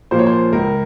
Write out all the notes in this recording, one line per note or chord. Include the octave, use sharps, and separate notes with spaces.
A#2 F3 A#3 C5
C#5
C5
C#2 A#4